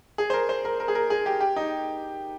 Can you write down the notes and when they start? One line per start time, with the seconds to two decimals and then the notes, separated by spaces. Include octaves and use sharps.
0.18 G#4
0.30 C5
0.34 A#4
0.49 C5
0.65 A#4
0.80 A#4
0.88 G#4
0.95 A#4
1.10 G#4
1.26 G4
1.41 G4
1.56 D#4